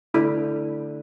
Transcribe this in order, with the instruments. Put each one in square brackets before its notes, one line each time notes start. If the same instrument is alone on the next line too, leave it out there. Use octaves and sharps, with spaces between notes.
[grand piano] D3 A3 D4 [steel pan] E4